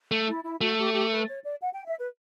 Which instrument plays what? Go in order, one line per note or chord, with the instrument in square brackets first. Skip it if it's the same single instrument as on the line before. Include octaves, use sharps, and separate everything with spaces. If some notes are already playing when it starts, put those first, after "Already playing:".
[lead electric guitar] A3
[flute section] E4
E4
[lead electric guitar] A3 [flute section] F#4
[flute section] G4
G4
B4
C#5
D5
F#5
G5
E5
B4